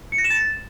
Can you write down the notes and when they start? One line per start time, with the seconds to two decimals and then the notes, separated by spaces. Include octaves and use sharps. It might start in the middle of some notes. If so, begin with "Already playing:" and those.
0.12 C#7
0.18 A#6
0.24 E7
0.30 A6